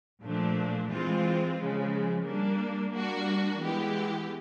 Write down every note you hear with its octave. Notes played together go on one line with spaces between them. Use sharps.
A#2 F3 A3 D4
E3 G#3 C4 F4
C#3 F3 G#3
G3 A#3 D4
G3 A#3 D4 F#4
E3 G#3 B3 E4 G4